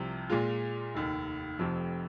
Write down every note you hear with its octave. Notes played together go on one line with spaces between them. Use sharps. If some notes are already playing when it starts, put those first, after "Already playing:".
Already playing: C2 C3 F3
A#2 G#3 F4
F1 D#2 D#3
F1 F2 C3 F3